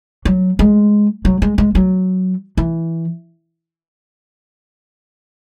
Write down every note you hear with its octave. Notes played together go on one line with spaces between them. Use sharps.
F#3
G#3
F#3
G#3
G#3
F#3
E3